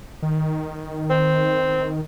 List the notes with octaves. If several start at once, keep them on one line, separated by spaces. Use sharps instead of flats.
D#3
C4